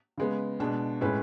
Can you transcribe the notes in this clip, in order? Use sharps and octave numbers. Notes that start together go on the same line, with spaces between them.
C#3 G#3 B3
B2 G#3 D4
A2 G#3 C#4 G#4 B4